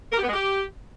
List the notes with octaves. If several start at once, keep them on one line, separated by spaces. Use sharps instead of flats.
A#4
G4
B3
G#3
G4